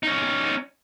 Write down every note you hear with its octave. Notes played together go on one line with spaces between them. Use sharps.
C#4 D#4